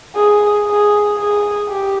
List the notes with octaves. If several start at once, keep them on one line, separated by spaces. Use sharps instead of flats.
G#4
G#4
G#4
G4